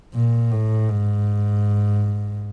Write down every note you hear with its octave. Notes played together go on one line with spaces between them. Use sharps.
A#2
A2
G#2